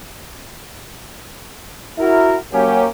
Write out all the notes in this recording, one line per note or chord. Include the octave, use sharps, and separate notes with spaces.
E4 F#4 A#4
F#3 A#3 C#4 G4